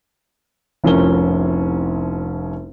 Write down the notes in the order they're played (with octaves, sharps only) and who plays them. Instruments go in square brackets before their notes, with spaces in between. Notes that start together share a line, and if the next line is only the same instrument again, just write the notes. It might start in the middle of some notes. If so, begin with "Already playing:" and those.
[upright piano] F1 C2 F3 C#4 A#4 G7